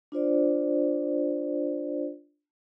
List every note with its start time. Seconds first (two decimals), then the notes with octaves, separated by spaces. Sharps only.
0.12 D4 F4 C5 D5